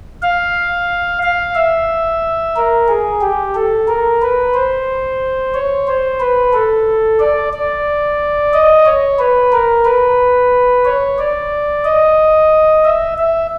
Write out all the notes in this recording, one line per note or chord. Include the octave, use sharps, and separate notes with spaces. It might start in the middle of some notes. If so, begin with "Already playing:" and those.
F5
F5
E5
A#4
G#4
G4
A4
A#4
B4
C5
C#5
C5
B4
A4
D5
D5
D#5
C#5
B4
A#4
B4
C#5
D5
D#5
E5
E5